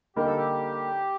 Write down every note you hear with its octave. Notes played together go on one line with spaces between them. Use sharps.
D3 G3 A#3 D#4 G4 A#4
A4
G4